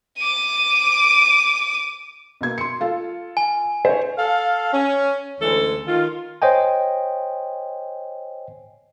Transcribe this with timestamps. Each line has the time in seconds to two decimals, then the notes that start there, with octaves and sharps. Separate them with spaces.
0.18 D6 D#7
2.41 B2 A#3 G#6
2.58 C6 C#7
2.81 F4 A4 F5
3.37 G#5
3.85 C5 C#5
4.17 A4 F5
4.73 C#4
5.40 D2 E3 G#3 C#4 A4
5.86 D#3 F4
6.42 C5 C#5 D#5 G5 G#5